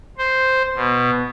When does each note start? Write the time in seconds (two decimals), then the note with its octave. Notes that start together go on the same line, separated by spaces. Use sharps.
0.18 C5
0.75 B2